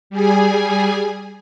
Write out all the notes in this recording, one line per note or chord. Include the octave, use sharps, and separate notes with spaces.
G3 G#4 G#5